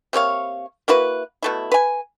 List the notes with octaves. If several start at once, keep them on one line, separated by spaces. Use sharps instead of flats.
C3 A#3 C#5 F5
A#3 E4 F#4 B4
B2 A3 E4
B4 G#5